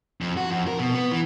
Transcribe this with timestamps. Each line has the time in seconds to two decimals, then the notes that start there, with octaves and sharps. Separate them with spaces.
0.21 F2
0.37 F#4
0.51 F2
0.67 A#4
0.79 B2
0.94 B3
1.12 E3